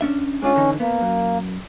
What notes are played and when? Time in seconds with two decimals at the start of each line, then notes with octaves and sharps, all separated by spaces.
0.01 C#4 D4 E5
0.42 G#3 C#4 D4 F4
0.56 D3 E3 D#4
0.80 A#3 B3
1.01 F#2